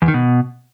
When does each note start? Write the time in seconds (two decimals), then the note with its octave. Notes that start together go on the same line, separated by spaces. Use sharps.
0.02 E2
0.08 D#3
0.14 B2